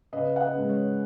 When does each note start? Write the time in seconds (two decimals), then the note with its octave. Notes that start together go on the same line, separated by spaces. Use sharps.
0.13 C#3 B4 D#5
0.36 F#5
0.41 B4 D#5
0.55 G#3 C#4
0.69 C#5